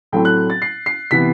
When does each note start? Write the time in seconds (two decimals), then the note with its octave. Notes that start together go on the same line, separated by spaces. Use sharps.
0.12 A2 F#3 A3 C4 G5
0.25 F#6
0.50 A6
0.62 C7
0.86 C7
1.11 C3 E3 B3 B6